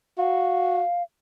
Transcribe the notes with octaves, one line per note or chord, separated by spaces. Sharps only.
F#4 F5